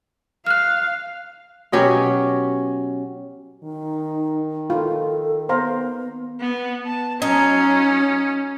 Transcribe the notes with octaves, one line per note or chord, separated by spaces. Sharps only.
F5 F6 F#6
B2 F#3 C#4 G4
D#3 D#4
F4 A4
B3 C5 F5 A#5
B3
A5
F#3 C#4 D#4